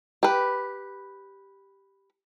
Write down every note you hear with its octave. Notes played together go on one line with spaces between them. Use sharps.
G4 B4